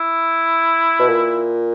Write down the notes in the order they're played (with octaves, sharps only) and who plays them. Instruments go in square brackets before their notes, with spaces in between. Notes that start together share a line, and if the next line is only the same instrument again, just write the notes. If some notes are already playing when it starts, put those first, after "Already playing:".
Already playing: [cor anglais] E4
[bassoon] B2
A#2